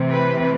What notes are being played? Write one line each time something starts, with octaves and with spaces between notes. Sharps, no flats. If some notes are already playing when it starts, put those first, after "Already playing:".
Already playing: C3 E3 A3 C4
B4